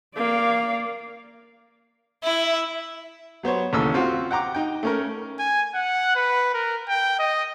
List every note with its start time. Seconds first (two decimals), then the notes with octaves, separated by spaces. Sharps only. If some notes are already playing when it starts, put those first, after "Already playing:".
0.16 A#3 D5 F5
2.24 E4 E5
3.43 F#3 B3 C5 C#5
3.73 A1 D#2 C#3 A4 E6
3.94 C4 F4 F#4
4.31 F#5 G5 A#5 D6
4.55 D#4 G5
4.83 A3 C#4 A#4
5.39 G#5
5.74 F#5
6.16 B4
6.54 A#4
6.88 G5
7.19 D#5